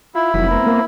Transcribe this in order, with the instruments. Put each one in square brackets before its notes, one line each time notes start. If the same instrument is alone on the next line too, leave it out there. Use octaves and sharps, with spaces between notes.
[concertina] E4 [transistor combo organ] F4
[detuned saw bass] F1 [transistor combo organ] E3 F#3 B5
[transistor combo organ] B3 C4 A#4
[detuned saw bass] A#3